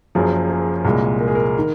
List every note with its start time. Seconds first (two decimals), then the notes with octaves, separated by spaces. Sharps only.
0.15 F#1 F#2 F3 G#4
0.50 G#4
0.85 C2 A#2 G#3
1.20 A#4
1.28 G#4
1.35 A#4
1.59 D#3